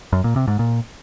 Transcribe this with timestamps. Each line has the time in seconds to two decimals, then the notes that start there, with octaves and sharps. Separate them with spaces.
0.13 F#2
0.24 A#2
0.36 C3
0.47 G#2
0.59 A#2